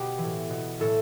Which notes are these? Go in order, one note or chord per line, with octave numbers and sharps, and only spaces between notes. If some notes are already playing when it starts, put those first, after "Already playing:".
Already playing: B2 G4
E3
A2
B2
A2 E3 A4